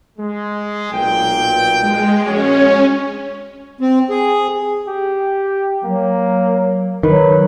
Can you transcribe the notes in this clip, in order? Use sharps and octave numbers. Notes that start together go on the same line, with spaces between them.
G#3
B1 A#2 G5
G#3
A#1 C#4 F#4 C#5
C4
G#4
G4
F#3 A#3
D#3 F#3 B4